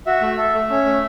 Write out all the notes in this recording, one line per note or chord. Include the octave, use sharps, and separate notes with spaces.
F#4 E5
A3
A4
A3
C#4
A3